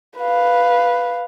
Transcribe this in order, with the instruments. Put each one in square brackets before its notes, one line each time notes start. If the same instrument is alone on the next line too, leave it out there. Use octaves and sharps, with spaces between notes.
[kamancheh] B4 F5